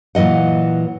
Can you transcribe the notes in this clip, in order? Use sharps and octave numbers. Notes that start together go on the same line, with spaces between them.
A#2 E3 F#3 D#5 F#5